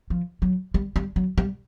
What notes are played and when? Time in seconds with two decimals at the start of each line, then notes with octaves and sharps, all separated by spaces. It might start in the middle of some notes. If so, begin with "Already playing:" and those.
0.10 F3
0.42 F#3
0.74 G3
0.96 G3
1.16 F#3
1.38 G3